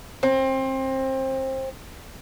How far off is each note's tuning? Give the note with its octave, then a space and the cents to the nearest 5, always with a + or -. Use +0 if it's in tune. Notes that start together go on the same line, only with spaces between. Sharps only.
C4 +25